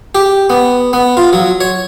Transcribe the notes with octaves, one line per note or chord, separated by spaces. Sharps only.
G4
B3
B3
F4
F#3
C#5